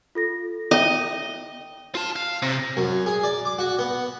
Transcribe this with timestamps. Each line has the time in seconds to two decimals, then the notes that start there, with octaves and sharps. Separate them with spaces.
0.15 F4 A4 A#6
0.71 D#5 E5 G5
1.95 F4 A5
2.16 F5
2.42 C3
2.77 F#2
3.06 G#4
3.24 D5
3.45 D6
3.59 F#4
3.79 B3